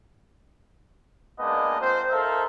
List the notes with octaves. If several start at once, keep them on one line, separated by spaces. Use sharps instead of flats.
G#3 A#3 B3 D4 D#4 D#5
C4 F4 C5
D#4 A4 A#4 C5 E5 F5